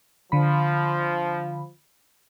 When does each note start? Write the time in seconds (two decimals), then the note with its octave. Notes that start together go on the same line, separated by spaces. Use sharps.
0.32 D3 F3 B5